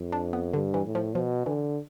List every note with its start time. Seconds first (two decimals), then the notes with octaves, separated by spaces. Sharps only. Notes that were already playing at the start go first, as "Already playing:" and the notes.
Already playing: F2
0.12 D4
0.33 B3
0.53 G2 D3
0.74 E3
0.85 A2
0.95 F3
1.15 B2 F3
1.46 D3 E3